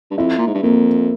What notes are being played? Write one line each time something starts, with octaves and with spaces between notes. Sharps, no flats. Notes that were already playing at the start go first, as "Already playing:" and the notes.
G2
F2 E4
A#2
G#2
G2
F2 A#3